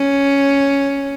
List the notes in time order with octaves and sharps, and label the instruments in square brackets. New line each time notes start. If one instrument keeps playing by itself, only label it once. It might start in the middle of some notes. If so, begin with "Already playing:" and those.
Already playing: [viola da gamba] C#4